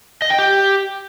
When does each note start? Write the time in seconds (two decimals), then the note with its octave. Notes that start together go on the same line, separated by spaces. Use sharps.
0.22 D#5
0.30 G5
0.39 G4